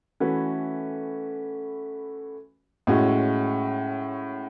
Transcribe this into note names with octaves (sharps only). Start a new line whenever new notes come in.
E3 A3 C#4 F#4 B4
A2 G#3 C#4 F#4